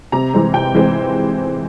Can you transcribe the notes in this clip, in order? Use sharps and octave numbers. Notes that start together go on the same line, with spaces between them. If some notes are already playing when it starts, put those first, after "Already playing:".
C3 A#5
E3 G#3 C4
C3 G5
E3 G#3 C4